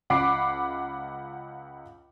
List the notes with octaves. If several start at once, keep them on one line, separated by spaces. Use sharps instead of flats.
C#2 F#5 B5 D6 C7